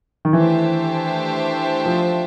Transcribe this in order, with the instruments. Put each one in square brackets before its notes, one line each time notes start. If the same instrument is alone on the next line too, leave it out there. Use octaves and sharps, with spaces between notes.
[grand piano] D#3
[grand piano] E3 [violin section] A3 D4 G4 C5 E5
[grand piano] F3